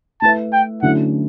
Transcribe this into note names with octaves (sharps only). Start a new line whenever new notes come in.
A3 E4 B4 E5 A5
G5
D3 F#3 A3 C#4 E4 F#5